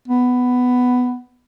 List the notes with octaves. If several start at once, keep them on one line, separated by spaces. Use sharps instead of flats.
B3